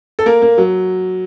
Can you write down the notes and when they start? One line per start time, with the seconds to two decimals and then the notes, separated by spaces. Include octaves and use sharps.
0.19 A4
0.26 A#3 A#4
0.42 A#3
0.58 F#3